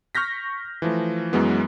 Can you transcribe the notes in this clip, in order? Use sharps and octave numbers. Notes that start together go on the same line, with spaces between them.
C#6 F6 G6 A#6 B6
E3 F3 A3
F#2 E3 F#3 G#3 B3